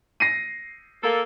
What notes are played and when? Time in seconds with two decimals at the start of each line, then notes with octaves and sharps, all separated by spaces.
0.20 A#6 C7 D#7
1.03 A#3 A4